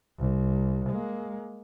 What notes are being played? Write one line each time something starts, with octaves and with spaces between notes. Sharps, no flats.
C2
G#3 A#3